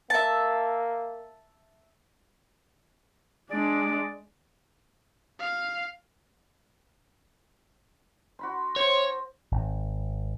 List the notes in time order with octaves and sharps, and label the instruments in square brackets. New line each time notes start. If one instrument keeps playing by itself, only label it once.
[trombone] A#3 [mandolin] E5 A5
[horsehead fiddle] G#3 D4 [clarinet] D5
[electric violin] F5
[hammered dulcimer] F#4 B5 C6
[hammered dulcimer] C5 [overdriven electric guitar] C#5
[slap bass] G#1